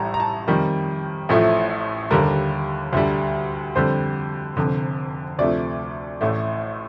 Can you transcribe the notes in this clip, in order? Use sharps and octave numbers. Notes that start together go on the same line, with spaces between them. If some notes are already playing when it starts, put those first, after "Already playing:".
Already playing: A1 A2 G3 A5 A#5
A#5
A5
F2 D#3 G3 A#4
A1 A2 F3 A3
D#2 D3 G3 A#4
D2 D3 G3
F2 D3 G3 C5
F1 F2 D3
D2 C3 F3 A3 D5
A1 A2 A3